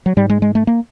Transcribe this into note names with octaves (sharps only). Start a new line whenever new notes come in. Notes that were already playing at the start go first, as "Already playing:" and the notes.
F#3
G#2 G3
G#3
G#3
A3
A#3